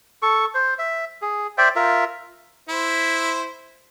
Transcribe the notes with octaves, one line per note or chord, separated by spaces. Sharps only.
A4 C#6
C5
E5
G#4
C5 D5 E5 G5
F4 A#4 E5
E4 C5